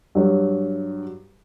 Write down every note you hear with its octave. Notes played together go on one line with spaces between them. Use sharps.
G2 F#3